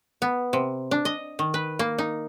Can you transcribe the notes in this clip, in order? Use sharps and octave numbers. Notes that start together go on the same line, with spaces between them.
B3
C3
D4
D#5
D#3
B4
A#3
D#4